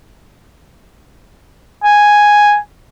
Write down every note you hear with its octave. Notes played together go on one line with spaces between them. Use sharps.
G#5